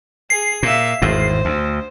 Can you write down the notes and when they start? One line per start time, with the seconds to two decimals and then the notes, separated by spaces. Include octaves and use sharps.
0.30 G#4 C7
0.63 A#2 E5 F5
1.02 G#1 E2 A2 C5
1.45 D2